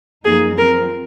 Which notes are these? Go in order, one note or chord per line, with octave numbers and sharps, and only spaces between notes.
F#2 F3 A#3 D#4 G#4
F3 C4 F4 A#4